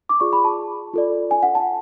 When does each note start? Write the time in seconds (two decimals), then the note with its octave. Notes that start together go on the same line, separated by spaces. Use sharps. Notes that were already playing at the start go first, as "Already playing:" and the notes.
0.09 D6
0.20 F4 G#4 D5 C#6
0.33 B5
0.44 A5
0.93 F4 A4 D5
1.31 G#5
1.43 F#5
1.55 A5